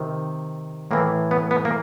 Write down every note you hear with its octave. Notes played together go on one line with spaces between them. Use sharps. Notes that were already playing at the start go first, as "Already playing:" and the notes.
Already playing: C3 D#3
A2 E3 A#3
B3
B3
A#3